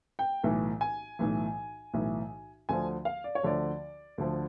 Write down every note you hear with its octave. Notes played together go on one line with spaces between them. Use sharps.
G5
B1 A2 E3
G#5
B1 A2 E3
B1 A2 E3
D2 D3 F3 G#5
F5
D5
C#5
D2 D3 F3 D5
D2 D3 F3